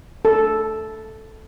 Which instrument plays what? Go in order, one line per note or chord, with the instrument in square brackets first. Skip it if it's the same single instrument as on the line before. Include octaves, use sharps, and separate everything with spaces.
[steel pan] A4